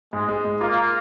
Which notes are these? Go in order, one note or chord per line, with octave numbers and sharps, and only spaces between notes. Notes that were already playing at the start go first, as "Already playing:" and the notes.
G#2 G#3
G#3
G#2
A#3 F4